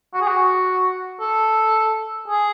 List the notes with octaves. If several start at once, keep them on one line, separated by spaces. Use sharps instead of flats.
F#4
G#4
F#4
A4
G#4